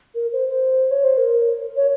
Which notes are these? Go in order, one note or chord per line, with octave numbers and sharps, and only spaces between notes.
A#4
C5
C5
C#5
C5
A#4
C#5